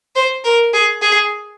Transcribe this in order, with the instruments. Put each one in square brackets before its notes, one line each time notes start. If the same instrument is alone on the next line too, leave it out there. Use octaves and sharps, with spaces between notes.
[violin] C5
A#4
G#4
G#4